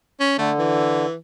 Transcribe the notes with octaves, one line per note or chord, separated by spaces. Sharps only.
C#4
D3 A3
E3